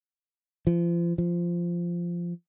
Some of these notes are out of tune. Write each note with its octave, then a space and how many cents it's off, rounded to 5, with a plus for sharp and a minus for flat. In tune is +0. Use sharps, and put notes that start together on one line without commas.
F3 -35
F3 -10